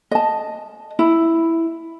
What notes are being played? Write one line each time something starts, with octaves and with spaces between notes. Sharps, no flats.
D#5 A5
E4